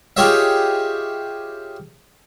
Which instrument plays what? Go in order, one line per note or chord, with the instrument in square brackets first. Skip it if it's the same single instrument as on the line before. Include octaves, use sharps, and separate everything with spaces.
[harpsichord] F4 G4 G#4 C#5 D#5 E5